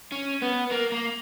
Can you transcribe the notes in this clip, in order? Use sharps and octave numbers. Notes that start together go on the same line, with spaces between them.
C#4
B3
A#3
A#3